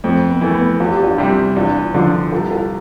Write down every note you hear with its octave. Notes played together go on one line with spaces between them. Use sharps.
F2 A3 C4
B3
E3 A3
B3
E2 F4
G4
D4 F4
C3 G3
E2 D4 F4
D3 F3 D4 F4
C2 F4 A4
F4 A4